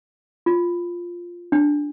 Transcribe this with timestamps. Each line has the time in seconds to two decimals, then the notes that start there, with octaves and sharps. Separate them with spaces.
0.46 F4
1.52 D4